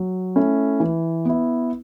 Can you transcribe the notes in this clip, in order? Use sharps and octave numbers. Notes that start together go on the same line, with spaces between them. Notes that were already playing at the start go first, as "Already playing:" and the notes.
Already playing: F#3
A3 C#4 E4
E3
B3 E4